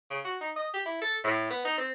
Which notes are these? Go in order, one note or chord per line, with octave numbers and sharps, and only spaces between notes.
C#3
F#4
D#4
D#5
G4
E4
A4
A2
B3
D#4
C4